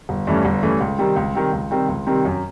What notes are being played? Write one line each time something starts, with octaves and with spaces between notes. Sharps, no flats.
G1
G2 E3 A3 C#4
G1
G2 E3 A3 C#4
C#2
C3 D#3 G3 C4
C#2
C3 D#3 G3 C4
C#2
C3 D#3 G3 C4
C#2
C3 D#3 G3 C4
F#2